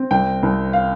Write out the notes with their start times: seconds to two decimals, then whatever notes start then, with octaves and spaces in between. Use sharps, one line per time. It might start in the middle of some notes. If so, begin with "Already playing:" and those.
Already playing: C4
0.11 C2 G5
0.43 C2
0.73 F5